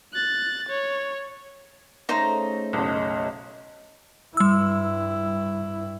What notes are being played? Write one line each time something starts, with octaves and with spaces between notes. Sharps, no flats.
F#6 A6
C#5
C#3 A3 D#4 C5 A#5
F#1 B1 D#5
G2 G3 E4 E6